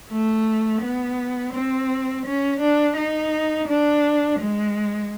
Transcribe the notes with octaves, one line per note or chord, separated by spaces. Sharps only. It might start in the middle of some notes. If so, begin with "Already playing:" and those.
A3
B3
C4
C#4
D4
D#4
D4
G#3